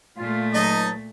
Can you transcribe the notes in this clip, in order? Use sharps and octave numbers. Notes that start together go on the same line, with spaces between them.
A#2 A3 F4
C#2 F#3 D#4 D#5 A5